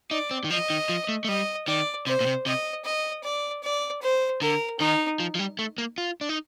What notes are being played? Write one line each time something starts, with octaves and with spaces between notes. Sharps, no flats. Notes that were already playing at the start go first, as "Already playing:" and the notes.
D#4 D5
C4
D#3
F3 D#5
D#3
F3
A3
A3
G3 D#5
D#3 D5
C3 C5
A#2
C3
C3 D#5
D#5
D5
D5
C5
D3 A#4
D#3 D#4
F3
F3
G3
A3
A#3
F4
D4
D#4